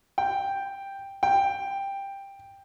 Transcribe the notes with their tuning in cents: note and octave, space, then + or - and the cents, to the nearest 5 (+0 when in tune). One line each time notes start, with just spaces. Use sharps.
G5 +5
G5 +10